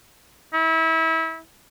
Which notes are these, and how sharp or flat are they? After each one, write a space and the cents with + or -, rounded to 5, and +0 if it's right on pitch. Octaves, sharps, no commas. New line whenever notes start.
E4 -30